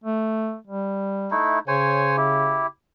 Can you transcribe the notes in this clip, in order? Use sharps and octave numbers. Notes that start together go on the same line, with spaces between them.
A3
G3
A3 D#4 E4
C#3 C5 C#5 G#5
E4 G4